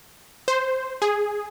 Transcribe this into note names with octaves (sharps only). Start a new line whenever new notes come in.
C5
G#4